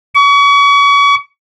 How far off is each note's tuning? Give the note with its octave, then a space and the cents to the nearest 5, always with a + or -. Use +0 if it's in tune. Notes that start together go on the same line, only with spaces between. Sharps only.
C#6 +35